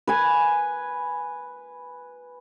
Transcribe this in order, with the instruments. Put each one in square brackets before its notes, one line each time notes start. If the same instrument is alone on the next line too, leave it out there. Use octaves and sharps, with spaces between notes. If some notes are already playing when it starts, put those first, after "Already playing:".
[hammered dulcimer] B4 G#5